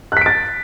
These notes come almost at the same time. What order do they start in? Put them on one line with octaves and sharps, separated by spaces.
F#6 B6 D7 A6